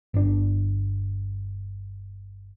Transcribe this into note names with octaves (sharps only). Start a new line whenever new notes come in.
G1 D4